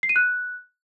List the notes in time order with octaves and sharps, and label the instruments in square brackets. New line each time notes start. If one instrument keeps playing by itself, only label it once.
[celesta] C7
D#7
F#6